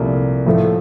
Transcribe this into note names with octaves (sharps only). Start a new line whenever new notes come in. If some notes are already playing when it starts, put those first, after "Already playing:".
Already playing: C2 A#2 F3 A3
A2 F3 A3